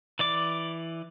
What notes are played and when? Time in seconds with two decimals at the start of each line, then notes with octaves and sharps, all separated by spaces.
0.19 E3 D5 D6